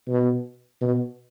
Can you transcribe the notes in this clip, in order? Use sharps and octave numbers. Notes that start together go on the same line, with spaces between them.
B2
B2